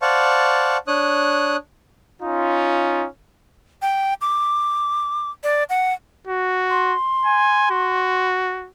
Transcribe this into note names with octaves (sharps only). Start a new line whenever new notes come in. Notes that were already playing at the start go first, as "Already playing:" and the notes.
C5 D5 F5 F#5 A5 C#6
D4 C#5 D#6 F#6
C#4 D#4 F4
G5
D6
D5
F#5
F#4
C6
G#5
F#4